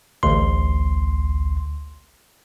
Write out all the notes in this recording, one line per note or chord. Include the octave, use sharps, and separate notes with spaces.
A1 D2 C6